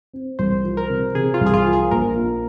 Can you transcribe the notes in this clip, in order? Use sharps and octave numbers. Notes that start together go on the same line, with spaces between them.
C4
C2 C5
F3
A#4
C3
C3 G#4
F4
C2
G#4
F4
F3
G#4
A#1 A#4
A#2